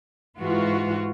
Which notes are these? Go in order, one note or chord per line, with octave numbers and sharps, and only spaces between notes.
G#2 E3 F4 F#4